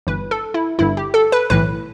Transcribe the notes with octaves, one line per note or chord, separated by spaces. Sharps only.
G1 G2 E3 B4
A4
E4
G1 G2 D3 E4
G4
A4
B4
B1 A2 E3 B4